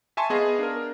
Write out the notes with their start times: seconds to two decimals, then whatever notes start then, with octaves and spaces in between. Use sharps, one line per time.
0.17 E5 G#5 A5 C6 C#6
0.30 B3 G#4 D#5 F5
0.59 D4 A#4